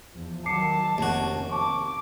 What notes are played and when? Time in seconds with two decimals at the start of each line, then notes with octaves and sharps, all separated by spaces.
0.14 E2 F3
0.46 D#3 F#3 A5 D6 C7 C#7
0.98 F1 D#2 C3 C#4 F#4
1.51 A5 C#6 D6